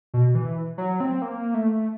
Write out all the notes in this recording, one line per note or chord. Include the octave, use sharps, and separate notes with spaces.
B2
E3
F#3
C4
A#3
A3